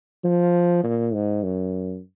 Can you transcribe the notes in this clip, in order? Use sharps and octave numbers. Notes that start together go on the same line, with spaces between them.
F3
A#2
G#2
F#2